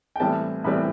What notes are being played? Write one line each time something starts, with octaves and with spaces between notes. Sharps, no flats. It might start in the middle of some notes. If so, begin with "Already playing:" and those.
G5
A2 E3 G3 C4 A5
A2 E3 G3 C4 B5